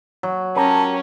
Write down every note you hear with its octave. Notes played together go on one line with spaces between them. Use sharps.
F#3
C#4 F#4 G4 A#4 A5